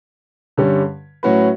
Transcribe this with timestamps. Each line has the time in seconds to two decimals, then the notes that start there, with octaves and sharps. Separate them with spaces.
0.57 G2 D3 G3 C#4 G4
1.23 A2 F#3 C#4 F#4 B4